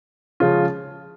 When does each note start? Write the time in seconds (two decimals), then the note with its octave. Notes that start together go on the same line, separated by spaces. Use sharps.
0.40 C#3 F3 G#3 C#4 F4